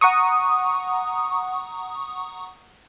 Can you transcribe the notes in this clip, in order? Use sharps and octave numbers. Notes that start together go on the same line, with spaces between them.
F#5 A#5 C#6 D#6